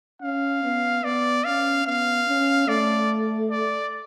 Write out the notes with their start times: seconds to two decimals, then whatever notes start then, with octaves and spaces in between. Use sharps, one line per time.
0.21 C#4 F5
0.64 B3
1.04 B3 D5
1.45 C#4 F5
1.86 B3 F5
2.28 C#4
2.68 A3 D5
3.50 D5